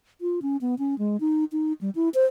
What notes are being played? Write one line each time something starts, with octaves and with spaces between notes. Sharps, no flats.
F4
C#4
B3
C#4
G#3
D#4
D#4
G3
E4
C5